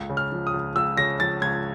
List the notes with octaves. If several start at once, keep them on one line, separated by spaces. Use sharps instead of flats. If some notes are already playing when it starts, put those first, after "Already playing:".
Already playing: C#2
C#3
F6
F3
D#6
C#2
C#2 E6
C#3 A#6
F3 A6
C#2 G#6